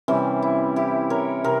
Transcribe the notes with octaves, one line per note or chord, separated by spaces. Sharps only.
C3 E3 G3 C#4
E4
E4 G4
A#4 C#5
C3 A#4